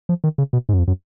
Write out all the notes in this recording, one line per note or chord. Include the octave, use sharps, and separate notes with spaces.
F3
D#3
C#3
B2
G#2
F#2
F2
F#2